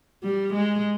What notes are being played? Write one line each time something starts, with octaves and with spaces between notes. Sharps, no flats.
G3
G#3